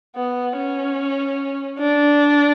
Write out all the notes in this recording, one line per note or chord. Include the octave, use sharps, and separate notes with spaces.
B3
C#4
D4